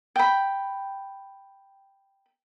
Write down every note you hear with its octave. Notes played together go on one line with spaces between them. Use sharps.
G5 B5